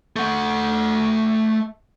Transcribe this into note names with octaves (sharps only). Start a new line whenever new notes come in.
A3 F#5